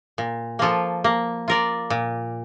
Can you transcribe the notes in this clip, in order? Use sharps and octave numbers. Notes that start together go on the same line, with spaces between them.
A#2
F3 A#3 F4 A4
A#3
F4 A#4 D5
A#2